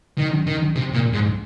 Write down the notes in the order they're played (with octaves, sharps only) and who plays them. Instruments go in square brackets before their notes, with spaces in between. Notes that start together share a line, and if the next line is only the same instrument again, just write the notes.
[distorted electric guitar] D#3
D#3
C3
A#2
G#2